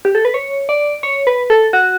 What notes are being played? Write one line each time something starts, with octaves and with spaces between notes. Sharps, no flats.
G4
A4
B4
C#5
D5
C#5
B4
A4
F#4